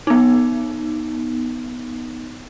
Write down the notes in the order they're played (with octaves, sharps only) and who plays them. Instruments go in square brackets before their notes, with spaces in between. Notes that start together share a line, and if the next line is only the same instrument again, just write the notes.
[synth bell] B3 D#4